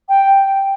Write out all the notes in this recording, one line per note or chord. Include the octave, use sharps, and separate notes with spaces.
G5